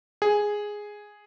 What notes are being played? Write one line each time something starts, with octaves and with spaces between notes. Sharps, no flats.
G#4